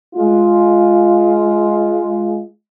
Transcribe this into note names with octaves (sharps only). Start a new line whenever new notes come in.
G#3 F4